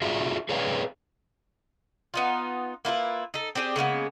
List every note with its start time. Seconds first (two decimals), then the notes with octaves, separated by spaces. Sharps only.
0.02 F4 F#4 G#4 D5 E5
0.49 G#4 B4 C#5 D5 F5 G5
2.14 B3 D#4 F4
2.85 A#3 E4 F4 B4
3.34 D#4 A4
3.55 C4 D4 G4 G#4
3.76 C#3 G#3 A#3 B3